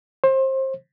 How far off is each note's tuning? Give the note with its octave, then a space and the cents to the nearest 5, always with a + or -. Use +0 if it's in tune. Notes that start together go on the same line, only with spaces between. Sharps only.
C5 +25